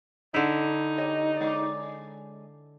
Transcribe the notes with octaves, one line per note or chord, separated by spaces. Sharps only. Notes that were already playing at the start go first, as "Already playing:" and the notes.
D3 D#4 E4
G4 C#5 D#5
G#3 D5